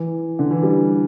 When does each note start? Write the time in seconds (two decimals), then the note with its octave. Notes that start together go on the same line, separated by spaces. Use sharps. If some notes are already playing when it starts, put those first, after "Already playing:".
Already playing: E3
0.39 D3
0.50 E3
0.63 G3